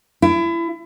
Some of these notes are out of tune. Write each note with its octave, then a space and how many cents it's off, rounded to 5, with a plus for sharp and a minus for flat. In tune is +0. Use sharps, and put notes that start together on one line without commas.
E4 +30